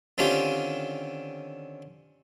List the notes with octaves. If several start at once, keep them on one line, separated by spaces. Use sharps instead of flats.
D3 D#3 C4 C#4 F4 G4